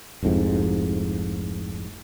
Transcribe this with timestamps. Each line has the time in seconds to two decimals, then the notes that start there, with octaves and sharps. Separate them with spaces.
0.23 F1 C2 F2 G#2